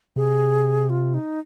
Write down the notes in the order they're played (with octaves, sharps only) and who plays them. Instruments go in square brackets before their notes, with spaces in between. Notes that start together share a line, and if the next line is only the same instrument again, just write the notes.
[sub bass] C3 [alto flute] G#4
[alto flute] F4
D#4